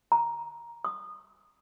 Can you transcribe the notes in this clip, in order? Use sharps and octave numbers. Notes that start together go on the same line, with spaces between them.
A#5
D#6